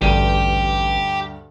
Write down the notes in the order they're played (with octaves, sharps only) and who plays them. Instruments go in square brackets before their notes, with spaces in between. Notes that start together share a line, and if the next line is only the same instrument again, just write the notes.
[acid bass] A1 [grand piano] D2 G2 D#7 [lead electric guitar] G4 G5